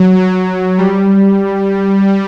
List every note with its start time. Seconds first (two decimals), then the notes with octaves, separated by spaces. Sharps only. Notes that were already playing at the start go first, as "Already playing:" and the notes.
Already playing: F#3
0.78 G3